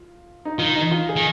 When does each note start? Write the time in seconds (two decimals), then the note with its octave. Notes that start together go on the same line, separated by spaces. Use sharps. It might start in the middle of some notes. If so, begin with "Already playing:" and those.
Already playing: F4
0.45 D#4
0.58 D#3 F4
0.75 D#4
0.91 F4
1.09 G#4
1.16 D#3